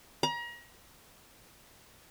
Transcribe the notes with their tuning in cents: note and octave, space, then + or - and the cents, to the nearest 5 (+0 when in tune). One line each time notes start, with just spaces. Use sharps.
A#5 +35